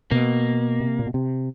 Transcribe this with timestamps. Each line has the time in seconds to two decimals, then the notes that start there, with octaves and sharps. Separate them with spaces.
0.11 B2 A#3
0.80 C3
0.99 A#2
1.06 B2
1.14 C3